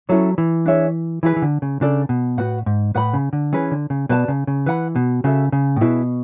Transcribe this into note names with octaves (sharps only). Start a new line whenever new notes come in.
F#3 C#4 E4 A4 C#5
E3
D4 G#4 C#5 E5
E3 E4 G#4 B4
E3
D3
C#3
C#3 D4 A4 D5
B2
A2 F#4 B4 F#5
G#2
A2 B4 F#5 B5
C#3
D3
E3 C#4 G#4 B4
D3
C#3
B2 B4 D5 A5
C#3
C#3
E3 B4 F#5 B5
B2
C#3 F#4 A4 E5
C#3
A2
B2 E4 G#4 B4